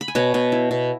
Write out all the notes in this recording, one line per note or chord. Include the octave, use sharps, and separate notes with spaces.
B5
G#5
B2 C#5 F#5
B2
E4
B2